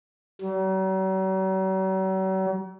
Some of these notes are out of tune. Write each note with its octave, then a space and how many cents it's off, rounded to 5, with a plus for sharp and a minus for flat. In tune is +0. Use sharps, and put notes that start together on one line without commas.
F#3 +45